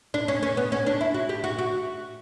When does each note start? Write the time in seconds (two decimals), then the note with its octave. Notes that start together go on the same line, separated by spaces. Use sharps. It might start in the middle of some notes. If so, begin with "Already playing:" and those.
0.14 D4
0.28 C#4
0.43 C#4
0.57 B3
0.72 C#4
0.86 D4
1.01 E4
1.14 F#4
1.29 G4
1.44 F#4
1.59 F#4